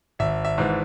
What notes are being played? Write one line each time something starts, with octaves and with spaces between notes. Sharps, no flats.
G#1 E5
E5
G#2 E3